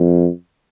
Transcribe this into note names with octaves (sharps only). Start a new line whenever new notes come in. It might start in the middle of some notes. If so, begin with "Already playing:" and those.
Already playing: F2